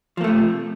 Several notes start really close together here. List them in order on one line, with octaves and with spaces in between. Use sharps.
F3 A#3 A3 C3